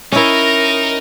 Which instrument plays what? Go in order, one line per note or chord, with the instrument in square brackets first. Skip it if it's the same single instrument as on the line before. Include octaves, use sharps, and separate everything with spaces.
[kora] C#4 E4 [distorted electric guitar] D#4 [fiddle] A#4